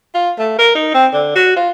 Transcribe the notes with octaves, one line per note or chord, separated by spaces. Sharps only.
F4
A3
A#4
D#4
C4
D3
F#4
F4